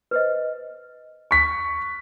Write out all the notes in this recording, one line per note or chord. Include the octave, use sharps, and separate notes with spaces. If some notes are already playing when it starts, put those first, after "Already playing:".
B4 C5 D#5
C#6 B6